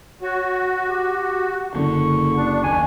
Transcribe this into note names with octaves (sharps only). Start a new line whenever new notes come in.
F#4 C#5
G4
F#1 D3 C#6
D4
D#2 G#5